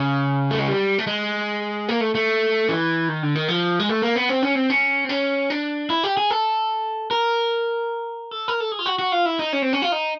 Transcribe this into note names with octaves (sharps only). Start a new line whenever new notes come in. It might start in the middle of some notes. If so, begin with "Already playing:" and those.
Already playing: C#3
A3
G#3
G3
A3
G#3
A#3
A3
A3
E3
D#3
D3
D#3
F3
G#3
A3
A#3
B3
C4
C#4
C4
C#4
C4
C#4
D4
E4
G4
G#4
A4
A#4
A4
A#4
A4
G#4
F4
F#4
F#4
F4
E4
D#4
C#4
C4
C#4
F4
D#4